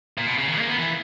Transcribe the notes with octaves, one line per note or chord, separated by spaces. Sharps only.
A#2
B2
C#3
D#3
A#3
B3
E3